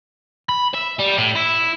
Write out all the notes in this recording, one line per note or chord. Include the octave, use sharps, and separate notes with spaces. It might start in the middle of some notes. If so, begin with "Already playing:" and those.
B5
E5
G3
A2
E4